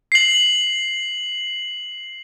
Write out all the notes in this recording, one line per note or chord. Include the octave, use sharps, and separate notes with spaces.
C7 F#7